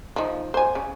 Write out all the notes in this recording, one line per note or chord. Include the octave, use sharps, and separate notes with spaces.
F3 D#4
C5 G#5
C#3